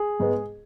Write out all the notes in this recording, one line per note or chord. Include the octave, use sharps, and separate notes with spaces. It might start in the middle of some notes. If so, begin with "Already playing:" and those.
Already playing: G#4
G#2 G#3 B3